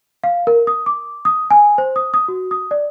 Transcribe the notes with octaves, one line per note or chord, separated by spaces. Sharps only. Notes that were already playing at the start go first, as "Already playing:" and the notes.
F5
A#4
D#6
D6
D#6
G#5
C5
D#6
D#6
F#4
D#6
D5